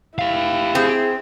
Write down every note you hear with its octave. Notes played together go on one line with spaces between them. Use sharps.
E4 G4 F5
C4 G#4